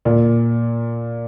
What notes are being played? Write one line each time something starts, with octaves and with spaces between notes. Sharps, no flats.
A#2